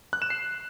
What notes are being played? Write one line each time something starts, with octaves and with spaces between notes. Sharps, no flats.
F#6
E7
C7